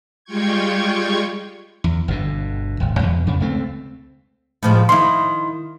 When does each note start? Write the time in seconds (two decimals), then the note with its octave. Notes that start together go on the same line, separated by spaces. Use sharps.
0.25 G3 G#3 F4 G5 C#6 G#6
1.84 E2
2.08 G1 B2 D3
2.80 D#1 G#1
2.99 E2 B2
3.27 F2 C#3
3.40 C#2 A3 C4
4.63 A2 F3 G#3
4.89 D#3 E4 C6